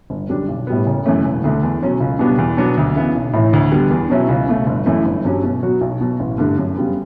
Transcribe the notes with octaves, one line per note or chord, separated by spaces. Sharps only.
G1
F#2 D3 G3 D4
B1
A2 G3 B3
F#1
F#2 E3 A3 C#4
E1
D2 D3 A3
E2
B2 F#3 C#4
C#2
B2 G3 B3 D4
E2
B2 F#3 B3 D4
D2
C#3 E3 B3
B1
A2 E3
D2
D3 G3 B3
E2
B2 F#3 C#4 E4
C#2
B2 A3
G1
F#2 E3 A3 E4
G1
G2 F#3 C#4
B2
F#3 B3 F#4
B1
B2 F#3
A1
G2 D3 A3
F#2
C#3 G3 B3